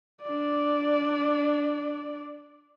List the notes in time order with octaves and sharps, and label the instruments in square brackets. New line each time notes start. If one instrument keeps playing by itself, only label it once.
[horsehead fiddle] D4 D5